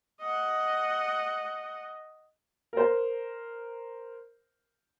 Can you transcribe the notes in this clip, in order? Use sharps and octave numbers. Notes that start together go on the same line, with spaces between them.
D#5 F#5
A#4 C5